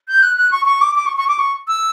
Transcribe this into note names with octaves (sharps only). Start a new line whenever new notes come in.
G6
F#6
F#6
C#6
C#6
D6
D6
C#6
C#6
D6
C#6
E6